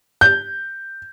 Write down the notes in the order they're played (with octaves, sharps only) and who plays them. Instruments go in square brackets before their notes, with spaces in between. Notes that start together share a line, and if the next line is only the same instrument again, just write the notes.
[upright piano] G6